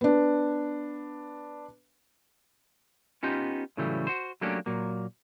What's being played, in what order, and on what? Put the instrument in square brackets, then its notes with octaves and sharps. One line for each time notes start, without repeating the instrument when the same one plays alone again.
[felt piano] B3 D4
[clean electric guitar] B3 C#4 D#4 F4 G4
A2 C#3 E3 F#3 G3 A3
F#4 C5
F#3 A3 A#3 C#4 D4 G4
A#2 F#3 A#3